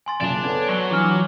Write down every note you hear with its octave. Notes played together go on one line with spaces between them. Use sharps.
G#5 C6 A6
F#1 F4 D5 A5 A6 E7 F7
B3 A4 C#5 G#6
F#3 C#6 F#6 G7
E3 F3 D4 D6 F6